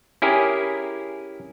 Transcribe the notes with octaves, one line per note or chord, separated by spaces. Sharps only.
C#4 E4 G4 G#4 A#4